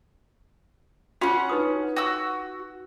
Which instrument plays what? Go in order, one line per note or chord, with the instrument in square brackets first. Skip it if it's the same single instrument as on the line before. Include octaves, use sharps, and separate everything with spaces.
[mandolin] C#4 F#5 [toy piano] F4 F#4 C6
[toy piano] D#4 B4 D#6
[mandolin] F#4 E6